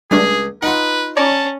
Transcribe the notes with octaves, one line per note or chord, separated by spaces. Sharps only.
C#2 G3 A3 D4 G#4 G#5
D#4 F4 B4 F#5
C#4 C#5 D5 A5 A#5